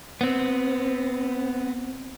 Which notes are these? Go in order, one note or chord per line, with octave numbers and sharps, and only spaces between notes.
B3 C4